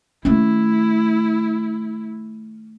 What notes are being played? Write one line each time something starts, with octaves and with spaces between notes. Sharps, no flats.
D#3 A3 C#4 E4